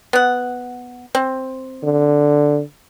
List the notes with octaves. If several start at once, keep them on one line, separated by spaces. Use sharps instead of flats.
B3 F#5
C4
D3